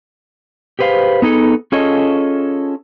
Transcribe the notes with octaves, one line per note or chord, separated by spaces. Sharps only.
G4 G#4 B4 C5 F5
B3 D#4 G#4 A4
C#4 F4 G#4 A4 C#5 D#5